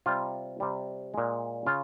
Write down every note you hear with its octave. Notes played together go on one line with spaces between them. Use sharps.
C3 G3 F4
C3 G3
A#2 G#3
C#3 F4